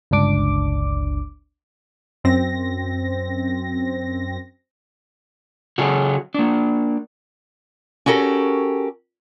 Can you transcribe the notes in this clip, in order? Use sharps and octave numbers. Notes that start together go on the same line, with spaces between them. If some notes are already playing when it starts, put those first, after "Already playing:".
G1 C#2 D4 D6
F#2 C4 A#6
C#3 F#3 F#4 G#4 A4
A#3 D4
C#4 F#4 G4 A4 A#4